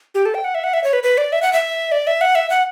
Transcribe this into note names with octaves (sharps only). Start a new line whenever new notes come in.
G4
A4
G5
F#5
E5
F#5
E5
C#5
B4
B4
D5
E5
F#5
E5
D5
E5
F#5
E5
F#5